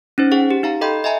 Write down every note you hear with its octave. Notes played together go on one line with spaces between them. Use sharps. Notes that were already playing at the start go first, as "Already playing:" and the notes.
C#4 D#4 C5
G#4 F#5 G5
G4
D#4 F5 A#5
A4 D#5 G5 B5 C6 G6
D#5 E5 G#5 A#5